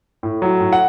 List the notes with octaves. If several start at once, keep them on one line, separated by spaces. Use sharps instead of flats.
A2
F#3
A2
F#5